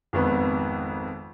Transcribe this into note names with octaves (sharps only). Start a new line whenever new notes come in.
G#1 F2 B3